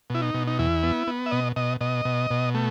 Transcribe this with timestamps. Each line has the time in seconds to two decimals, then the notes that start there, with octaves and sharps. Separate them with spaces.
0.10 B2 E4
0.22 D#4
0.34 B2
0.47 D#4
0.59 E2 E4
0.83 B3
1.07 B3
1.26 E5
1.31 B2 D#5
1.56 B2 D#5
1.81 B2 D#5
2.05 B2
2.31 B2
2.55 A3